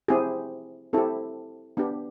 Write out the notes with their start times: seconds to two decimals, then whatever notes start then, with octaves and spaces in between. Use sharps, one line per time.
0.08 C4 E4 G4 G#4
0.93 C4 E4 G4 A4
1.77 B3 D4 G4